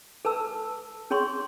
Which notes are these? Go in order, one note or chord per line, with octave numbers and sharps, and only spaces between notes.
A4 B4 A5 E6
C#4 G#4 C#5 C6 C#6